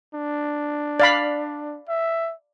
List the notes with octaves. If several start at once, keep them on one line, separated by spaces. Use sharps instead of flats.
D4
D5 F5 B5
E5